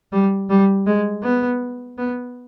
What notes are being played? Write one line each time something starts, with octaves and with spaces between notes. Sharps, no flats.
G3
G3
G#3
B3
B3